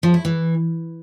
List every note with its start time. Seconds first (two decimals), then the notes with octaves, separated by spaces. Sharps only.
0.03 F3
0.14 E4
0.25 E3